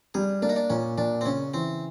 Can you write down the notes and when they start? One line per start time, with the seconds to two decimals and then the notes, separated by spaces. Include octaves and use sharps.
0.14 G3 G#4
0.42 A#3 D4
0.49 D#4
0.56 D4
0.70 A#2 C#4
0.98 A#2 D4
1.21 C4
1.26 C#3 C#4
1.54 E3 C4